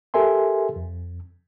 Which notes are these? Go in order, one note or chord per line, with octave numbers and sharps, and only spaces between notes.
G4 A4 A#4 E5 G#5 C6
F2